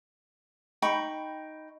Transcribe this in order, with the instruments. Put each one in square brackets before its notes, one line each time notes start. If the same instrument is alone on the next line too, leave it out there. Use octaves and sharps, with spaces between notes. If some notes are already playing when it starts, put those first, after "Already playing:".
[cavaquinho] D#4 G5 B5 C#6